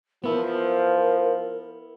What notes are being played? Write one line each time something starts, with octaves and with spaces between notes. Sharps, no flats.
F3 B3 E4 A#4